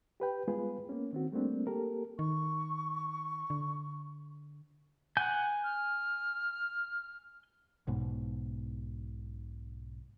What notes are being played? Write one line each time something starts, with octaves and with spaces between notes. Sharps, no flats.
G4 B4 G5
G3 G#3 B3 F4 G#4 B4
A#3 B3 C#4
D#3 C4 F#4
G3 A3 A#3 C4 D4
A#3 G4 A4 A#4
D#3 C#6
D3
F#5 G#5 G6
F6
B1 G#2 B2